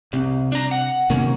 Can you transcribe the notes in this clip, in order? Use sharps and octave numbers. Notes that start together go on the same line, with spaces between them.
C2 C3
D4 A#5
F#5
C3 D#3 F#3 A#3 C#4